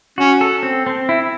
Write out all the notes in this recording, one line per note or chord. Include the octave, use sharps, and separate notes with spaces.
C#4 F#4
A4
C4
C4
E4